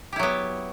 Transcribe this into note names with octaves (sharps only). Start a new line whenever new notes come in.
F#3 B3 E4 G4